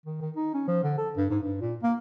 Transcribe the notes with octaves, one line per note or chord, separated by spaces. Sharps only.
D#3
D#3
D#4
C#4
F3
D3
A4
G2
G#2
G2
A#2
A#3